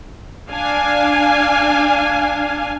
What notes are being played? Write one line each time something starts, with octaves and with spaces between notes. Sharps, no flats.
D4 F5 G#5